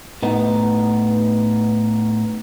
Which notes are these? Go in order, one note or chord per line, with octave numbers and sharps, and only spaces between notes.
A2 B3 D#4